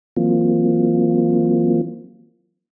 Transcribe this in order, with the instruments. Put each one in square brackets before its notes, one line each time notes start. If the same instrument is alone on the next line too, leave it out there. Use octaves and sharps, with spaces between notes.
[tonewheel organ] E3 F#3 A#3 C4 F4